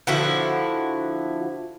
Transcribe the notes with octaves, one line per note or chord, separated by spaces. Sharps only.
D3 F3 E4 F#4